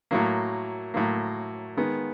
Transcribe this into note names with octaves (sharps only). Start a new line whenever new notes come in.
A2 F#3 A#3
A2 F#3 A#3
D#3 G#3 B3